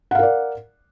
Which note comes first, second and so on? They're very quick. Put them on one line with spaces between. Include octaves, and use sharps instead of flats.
F#5 F5 A#4 D5